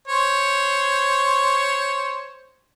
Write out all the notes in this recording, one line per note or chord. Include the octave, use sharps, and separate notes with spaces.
C5 C#5